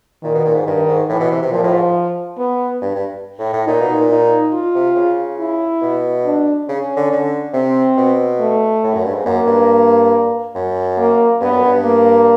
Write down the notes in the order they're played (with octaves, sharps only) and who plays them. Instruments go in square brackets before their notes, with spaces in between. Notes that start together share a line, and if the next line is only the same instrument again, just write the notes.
[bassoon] A#2 [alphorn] D#3
[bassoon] B2
A#2
G#2
[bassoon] G2 [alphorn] D#3
[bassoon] G#2
[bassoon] A2 [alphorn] E3
[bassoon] B2
C3
C3
[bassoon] A#2 [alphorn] F3
[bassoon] A2
G#2
[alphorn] B3
[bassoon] G2
G2
A2
A2
[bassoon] A#2 [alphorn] D#4
[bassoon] B2
A#2
[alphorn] D#4
F4
[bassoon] C3
C#3
[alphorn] E4
[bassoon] B2
[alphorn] D4
[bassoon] C#3 [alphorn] C#4
[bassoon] D3
D3
[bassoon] C3 [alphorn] C4
[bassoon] B2
[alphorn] A3
[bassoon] A2
F#2
G2
G#2
[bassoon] F#2 [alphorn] A#3
[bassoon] G2
F#2
[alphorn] A#3
[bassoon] G2 [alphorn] B3
[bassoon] F#2
G2
[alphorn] A#3